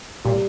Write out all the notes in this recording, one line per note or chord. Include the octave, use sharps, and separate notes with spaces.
A#2 G3